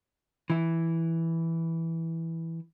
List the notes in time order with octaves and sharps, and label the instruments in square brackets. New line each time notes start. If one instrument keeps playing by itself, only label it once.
[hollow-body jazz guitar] E3 E4